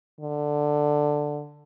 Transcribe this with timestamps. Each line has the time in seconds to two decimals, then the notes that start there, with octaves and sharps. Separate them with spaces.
0.21 D3